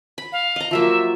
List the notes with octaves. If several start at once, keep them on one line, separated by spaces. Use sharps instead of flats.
B5
F5
D#5 A#5
F3 F#3 A#3 E5